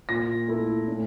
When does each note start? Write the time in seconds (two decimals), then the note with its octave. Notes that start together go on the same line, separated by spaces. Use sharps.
0.09 A#2 A#6
0.48 A3 E4
0.88 A2